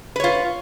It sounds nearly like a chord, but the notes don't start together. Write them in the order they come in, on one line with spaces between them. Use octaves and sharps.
B4 C#5 F4